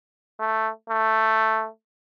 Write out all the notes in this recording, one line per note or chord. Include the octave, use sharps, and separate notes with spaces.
A3
A3